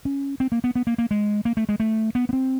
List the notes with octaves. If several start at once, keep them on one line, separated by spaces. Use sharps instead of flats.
C#4
C4
A#3
B3
B3
A#3
A#3
G#3
A#3
A3
G#3
A3
B3
B3
C4